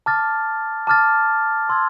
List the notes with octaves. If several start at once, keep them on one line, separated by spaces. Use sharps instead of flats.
A5 D6 F6 A6
A5 D6 F6 A6
C6 E6 G#6